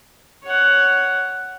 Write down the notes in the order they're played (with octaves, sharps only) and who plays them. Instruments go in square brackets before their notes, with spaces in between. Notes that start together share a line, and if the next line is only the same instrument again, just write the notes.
[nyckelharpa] C#5 F#5